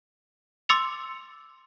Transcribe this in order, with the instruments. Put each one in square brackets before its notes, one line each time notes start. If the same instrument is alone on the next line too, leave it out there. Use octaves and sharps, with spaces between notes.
[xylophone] C6 D6 E6 A6 C#7 F7